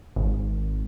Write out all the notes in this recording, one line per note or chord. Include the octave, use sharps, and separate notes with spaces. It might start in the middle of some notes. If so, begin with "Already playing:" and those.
G#1